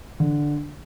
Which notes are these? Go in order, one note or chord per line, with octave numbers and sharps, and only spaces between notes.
D3